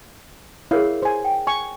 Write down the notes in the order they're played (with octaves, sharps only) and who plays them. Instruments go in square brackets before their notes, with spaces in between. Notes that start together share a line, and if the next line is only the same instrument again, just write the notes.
[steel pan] E4 F5 [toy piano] G#4 A#4 C#5
[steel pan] C5 G#5
[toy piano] G5
[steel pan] G#5 C#6